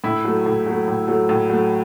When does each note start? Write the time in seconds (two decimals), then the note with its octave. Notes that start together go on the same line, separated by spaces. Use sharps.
0.04 A2 E4
0.25 F#3 A3
0.46 A2
0.66 F#3 A3
0.88 A2
1.08 F#3 A3
1.29 A2
1.50 F#3 A3